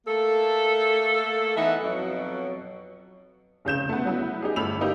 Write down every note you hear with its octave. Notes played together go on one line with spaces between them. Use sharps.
A3 A#3 A4
E3 B3 D#4 E5 F#5
F2 B2 F#3
F1 C#3 G6 E7
A3 B3
F#3 B3 E4
D#4 G4 G#4
G1 A3 B5 E6 F7
A#3 D#4 G4